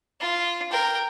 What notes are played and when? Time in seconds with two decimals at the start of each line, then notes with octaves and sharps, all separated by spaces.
0.20 F4
0.71 A#4 G5